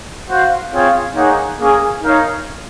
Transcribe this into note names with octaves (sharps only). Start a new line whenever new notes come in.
F#4 C5 F5
C4 F4 G#4 C#5 F5
A#3 D#4 G#4 C#5 F#5
A#3 C#4 G#4
D#4 A#4 C#5 F5